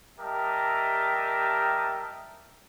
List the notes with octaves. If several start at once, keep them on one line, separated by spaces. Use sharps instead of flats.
G3 G4 A#4 D#5 E5 A5